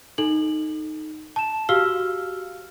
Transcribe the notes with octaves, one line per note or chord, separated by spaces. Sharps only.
D#4 A4 F#7
A5 E7
F#4 G4 F5 E6 F6 G7